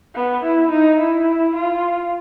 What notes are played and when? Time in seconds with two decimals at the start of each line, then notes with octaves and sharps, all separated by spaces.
0.15 B3
0.43 E4
0.70 D#4
0.99 E4
1.55 F4